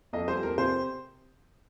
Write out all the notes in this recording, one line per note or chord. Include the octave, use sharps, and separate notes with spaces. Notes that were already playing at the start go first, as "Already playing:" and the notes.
F2 D#5
G3 C5
F2 A#4
C3 C5